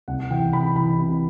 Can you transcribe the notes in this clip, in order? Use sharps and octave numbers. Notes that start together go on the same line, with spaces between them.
C2 F#5
E3 G5
C2 B5
E3 B5
C3